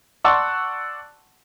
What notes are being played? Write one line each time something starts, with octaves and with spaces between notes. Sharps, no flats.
D5 F#5 A5 C6 C#6 E6